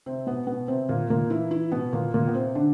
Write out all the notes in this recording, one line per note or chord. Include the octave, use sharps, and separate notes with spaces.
C3 C4
B2 B3
B2 B3
C3 C4
A#2 A#3
A#2 A#3
E3 E4
E3 E4
B2 B3
A#2 A#3
A#2 A#3
B3
C3 C4
D3 D4